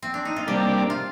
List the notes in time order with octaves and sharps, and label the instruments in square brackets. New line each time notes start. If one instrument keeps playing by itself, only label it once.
[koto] C4
D4
D#4
F4
[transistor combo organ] C3 G3 A#3 D4 [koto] G4
[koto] F4